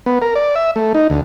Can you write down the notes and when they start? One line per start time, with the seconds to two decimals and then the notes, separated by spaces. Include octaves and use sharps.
0.06 B3
0.22 A#4
0.35 D5
0.55 E5
0.76 A3
0.95 D#4
1.10 D2